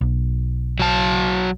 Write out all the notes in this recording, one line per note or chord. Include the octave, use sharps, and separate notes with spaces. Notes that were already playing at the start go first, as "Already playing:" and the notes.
B1
F#3 A5